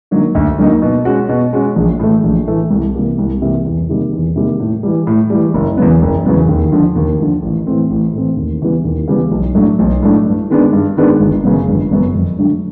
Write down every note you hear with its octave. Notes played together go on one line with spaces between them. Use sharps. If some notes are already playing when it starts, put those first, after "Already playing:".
D3 F#3 A#3 D#4
D2
D3 F#3 A#3 D#4
B2
G#3 C#4 F#4
B2
G#3 C#4 F#4
A#1
A2 E3 A3
A#1
A2 E3 A3
C2
C3 E3 G3 A#3
C2
C3 E3 G3 A#3
E2
C3 D#3 G3 A#3
E2
C3 D#3 G3 A#3
A2
E3 G3
A2
E3 G3
F#1
E2 C#3 F#3 B3
F#1
E2 C#3 F#3 B3
D#2
D3 F3
D#2
D3 F3
A1
A2 E3 A3 C4
A1
A2 E3 A3 C4
D#2
C#3 E3 G3 B3
D#2
C#3 E3 G3 B3
B1
A2 F#3 A3 D4
B1
A2 F#3 A3 D4
G2
D#3 G#3 B3 D4
G2
D#3 G#3 B3 D4
G1
F#2 C#3 F#3 B3
G1
F#2 C#3 F#3 B3
F2
D3 F#3 A3 D4